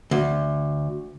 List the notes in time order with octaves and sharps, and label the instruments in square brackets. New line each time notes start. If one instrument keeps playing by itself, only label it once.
[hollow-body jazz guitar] D2